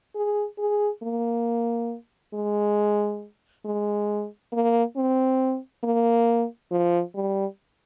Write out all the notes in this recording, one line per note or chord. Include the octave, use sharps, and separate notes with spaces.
G#4
G#4
A#3
G#3
G#3
A#3
C4
A#3
F3
G3